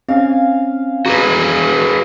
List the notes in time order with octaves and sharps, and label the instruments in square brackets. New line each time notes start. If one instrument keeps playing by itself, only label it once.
[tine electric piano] C4 C#4 [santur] F5 G#5
[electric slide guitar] F#4 G#4 B4 [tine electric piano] A#5